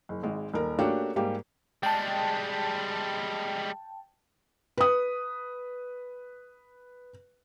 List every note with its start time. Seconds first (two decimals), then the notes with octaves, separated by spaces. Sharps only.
0.09 F#1
0.23 G#1 G#3
0.53 D#1 A#4
0.79 A3 A#3 C#4 D4 F#4 G4
1.16 G#2 G3 A#3 G4
1.83 G3 G#3 G5 A5
4.78 B4 D#6